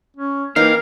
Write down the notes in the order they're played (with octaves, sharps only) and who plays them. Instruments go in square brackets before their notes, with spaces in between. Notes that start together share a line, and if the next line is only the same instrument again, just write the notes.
[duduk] C#4
[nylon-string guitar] E3 C4 D#4 [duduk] A#3 [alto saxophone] A#4 [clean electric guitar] F5